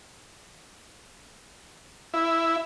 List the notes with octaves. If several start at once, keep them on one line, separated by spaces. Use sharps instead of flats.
E4